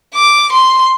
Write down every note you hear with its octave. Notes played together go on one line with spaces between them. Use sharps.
D6
C6